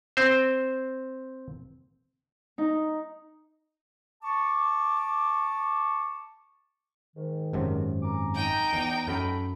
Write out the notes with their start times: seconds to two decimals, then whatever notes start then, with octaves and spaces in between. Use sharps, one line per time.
0.17 C4 C5
2.58 D#4
4.23 A5 C#6 D6
7.16 G#2 D#3
7.53 G#1 F#2 C3
8.03 G#5 A#5 D6
8.35 D#4 G5
8.73 E2
9.08 F#2 A3 A4 B5